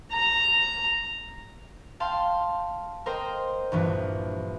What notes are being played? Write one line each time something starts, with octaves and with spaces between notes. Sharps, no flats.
A#5
F5 G5 A5 C6
A#4 C5 D#5 G5
A#1 G2 E3